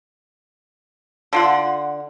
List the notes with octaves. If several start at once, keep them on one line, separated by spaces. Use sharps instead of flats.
D3 F4 F#5